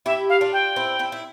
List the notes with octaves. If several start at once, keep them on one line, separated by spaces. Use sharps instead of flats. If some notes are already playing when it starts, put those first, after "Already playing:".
E4 G4 E5
F5
D4 F4
G5
C4 E4
C4 E4
E4